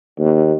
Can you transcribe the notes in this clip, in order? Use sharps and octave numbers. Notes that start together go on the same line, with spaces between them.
D#2